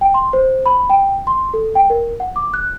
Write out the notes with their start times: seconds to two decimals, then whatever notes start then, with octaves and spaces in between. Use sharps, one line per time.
0.01 G5
0.14 C6
0.33 C5
0.66 B5
0.90 G5
1.27 C6
1.54 A4
1.75 G5
1.90 A#4
2.20 F#5
2.36 D6
2.54 F#6